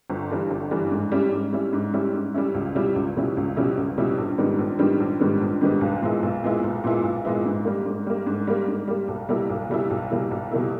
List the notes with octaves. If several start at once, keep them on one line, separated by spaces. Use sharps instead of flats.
G1
G2 E3 G3
G1
G2 E3 G3
G#2
G3 C#4 E4
G#2
G3 C#4 E4
G#2
G3 C#4 E4
G#2
G3 C#4 E4
C#2
B2 G3 C#4 E4
C#2
B2 G3 C#4 E4
C#2
B2 G3 C#4 E4
C#2
B2 G3 C#4 E4
A#1
G#2 D#3 G3 B3
A#1
G#2 D#3 G3 B3
A#1
G#2 D#3 G3 B3
A#1
G#2 D#3 G3 B3
B1
A#2 G#3 B3 E4
B1
A#2 G#3 B3 E4
B1
A#2 G#3 B3 E4
B1
A#2 G#3 B3 E4
G#2
G3 A#3
G#2
G3 A#3
G#2
G3 A#3
G#2
G3 A#3
B1
B2 G3 A#3 E4
B1
B2 G3 A#3 E4
B1
B2 G3 A#3 E4
B1
B2 G3 A#3 E4